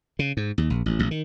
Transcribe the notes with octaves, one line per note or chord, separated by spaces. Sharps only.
C#3
G#2
D#2
A#1
A1
A1
D#3